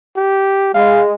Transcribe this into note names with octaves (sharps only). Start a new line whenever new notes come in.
G4
G#3 F5